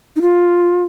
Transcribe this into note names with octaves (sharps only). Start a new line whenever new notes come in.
D#4
F4